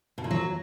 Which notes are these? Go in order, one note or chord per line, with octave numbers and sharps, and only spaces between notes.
B2
A#2
F#3